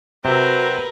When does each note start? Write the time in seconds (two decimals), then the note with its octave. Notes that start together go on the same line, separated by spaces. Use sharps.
0.25 C3 F#3 C4 F#4 A#4 B4 E5